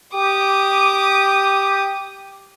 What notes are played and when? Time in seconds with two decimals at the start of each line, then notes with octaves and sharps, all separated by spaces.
0.15 G4 D6 D#6